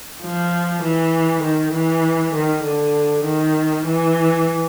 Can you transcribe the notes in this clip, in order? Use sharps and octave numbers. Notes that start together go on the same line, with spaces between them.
F3
E3
D#3
E3
D#3
D3
D#3
E3